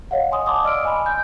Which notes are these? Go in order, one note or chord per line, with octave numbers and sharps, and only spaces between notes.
C#5 D#5 F5 F#5
G#5 C6 D#6
D#5 F#5 A5 C6 D6 D#6
D5 D#5 E6 F6 D7
G#5 B5 C6
G6